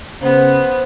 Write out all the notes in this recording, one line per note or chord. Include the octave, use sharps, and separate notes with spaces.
C#3 B3 C5